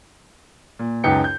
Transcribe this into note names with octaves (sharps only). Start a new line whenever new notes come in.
A#2
C#2 F#2 D#4 B4 G5 C#7
G6